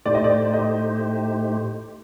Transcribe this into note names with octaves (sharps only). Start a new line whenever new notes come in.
A2 A3 D#4 G4 C5 D5
D#5
D5
D#5